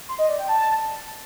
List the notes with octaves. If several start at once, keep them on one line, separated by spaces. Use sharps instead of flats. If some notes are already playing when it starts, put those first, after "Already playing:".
C6
D#5
D5
G5
A5